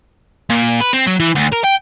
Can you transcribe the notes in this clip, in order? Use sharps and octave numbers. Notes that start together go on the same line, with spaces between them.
A#2
B4
C4
F#3
E3
D2
A#4
G5